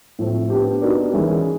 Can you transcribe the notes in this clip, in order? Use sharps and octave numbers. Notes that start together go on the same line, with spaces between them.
A2 F3 A3 C4
B3 D4 G4
B3 D#4 F#4 A#4 D5
E3 G#3 C#4 E4